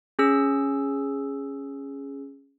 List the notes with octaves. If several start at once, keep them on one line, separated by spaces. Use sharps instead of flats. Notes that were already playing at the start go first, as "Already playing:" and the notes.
C#4 G#4 E6